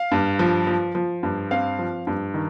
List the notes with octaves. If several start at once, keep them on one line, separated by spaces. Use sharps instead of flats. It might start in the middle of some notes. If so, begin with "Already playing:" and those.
Already playing: F5
G2
F3
F3
F3
G2
C4 F5
F3
G2
D#3